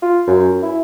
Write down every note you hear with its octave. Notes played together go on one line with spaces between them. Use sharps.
F4
F#2
E4